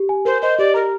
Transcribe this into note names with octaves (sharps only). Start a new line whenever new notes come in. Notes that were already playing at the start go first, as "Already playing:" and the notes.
Already playing: G4
G#5
A#4 C5
C5 D#5
G4 D5
A#4 A#5